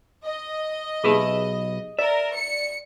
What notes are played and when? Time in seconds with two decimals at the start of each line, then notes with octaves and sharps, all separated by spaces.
0.25 D#5
1.04 B1 D#4 G4 G#4 B4 E5
1.99 A#4 D5 E5
2.34 C#7